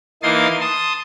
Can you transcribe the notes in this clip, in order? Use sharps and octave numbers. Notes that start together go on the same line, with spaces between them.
E3 A#3 D#4 C6 D#6 A6
A5 C6 D#6